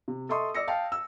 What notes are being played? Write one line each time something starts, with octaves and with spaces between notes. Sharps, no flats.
C3
A4 D#5 E5 C6 C#6 D#6
D5 E6 A#6 C#7
F5 G5 A5
E6